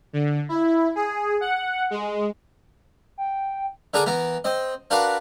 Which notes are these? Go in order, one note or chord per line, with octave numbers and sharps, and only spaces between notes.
D3
E4
G#4
F#5
G#3
G5
D3 D4 G#4 A#4 A#5 D#6
E3 B3 A#4
C4 D#5
D4 F#4 A#4 B4 F5 F#5